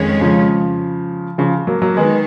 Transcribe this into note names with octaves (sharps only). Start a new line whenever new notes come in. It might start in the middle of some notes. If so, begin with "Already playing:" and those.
Already playing: F2 D#3 G#3 C#4
C#3 F3
C#3 F3
F#3 A#3
F#3 A#3
D#3 G#3 B3